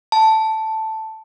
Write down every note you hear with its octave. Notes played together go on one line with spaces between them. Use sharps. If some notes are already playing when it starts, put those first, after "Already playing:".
A5